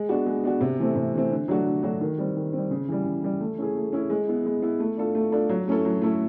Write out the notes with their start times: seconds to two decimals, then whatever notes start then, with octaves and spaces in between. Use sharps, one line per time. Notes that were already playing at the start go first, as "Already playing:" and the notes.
Already playing: G#3
0.09 B3 D4 F#4
0.27 G#3
0.44 B3 D4 F#4
0.61 C3
0.79 E3 A3 C4
0.96 C3
1.14 E3 A3 C4
1.31 D3
1.48 F#3 A3 D4 F#4
1.67 D3
1.83 F#3 A3 D4 F#4
2.01 D#3
2.18 G3 C4
2.36 D#3
2.53 G3 C4
2.71 C#3
2.88 E3 G3
3.06 C#3
3.23 E3 G3
3.40 A3
3.58 C#4 E4 G#4
3.75 A3
3.93 C#4 E4 G#4
4.10 G#3
4.28 B3 E4
4.46 G#3
4.62 B3 E4
4.80 A3
4.97 D4 F4 A4
5.15 A3
5.32 D4 F4 A4
5.49 F#3
5.68 A3 C#4 E4 A4
5.85 F#3
6.02 A3 C#4 E4 A4